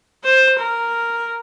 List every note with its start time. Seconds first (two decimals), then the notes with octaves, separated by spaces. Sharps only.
0.24 C5
0.58 A#4